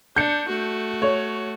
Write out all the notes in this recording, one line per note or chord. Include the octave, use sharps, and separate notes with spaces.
D4 G6 C#7
A3 F#4
C#5